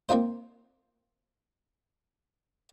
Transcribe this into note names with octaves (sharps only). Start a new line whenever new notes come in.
A#3 C4 D#4 F4 C5